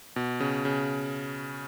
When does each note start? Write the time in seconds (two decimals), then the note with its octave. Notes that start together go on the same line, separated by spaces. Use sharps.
0.16 B2
0.40 C#3
0.65 C#3